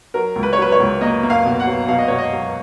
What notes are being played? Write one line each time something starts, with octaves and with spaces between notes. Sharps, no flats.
F#3 A#4
C#2
B4
C#5
F#3 B4
C#5
C#2
A#3 D#5
A#3
F5
B2
F#5
F#3
B2 F5
D#5
B2 C#5
D#5
F#3